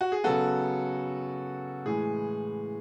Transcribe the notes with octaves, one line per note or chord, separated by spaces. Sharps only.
F#4
G#4
C#3 F#3 B3 F#4 A4
A2 E3 G#3 G#4